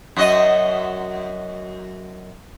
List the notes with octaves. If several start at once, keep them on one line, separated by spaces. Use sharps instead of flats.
F#2 F#4 D#5